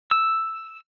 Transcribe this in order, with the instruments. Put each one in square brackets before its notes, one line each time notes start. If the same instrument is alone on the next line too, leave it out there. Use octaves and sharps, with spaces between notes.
[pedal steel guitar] E6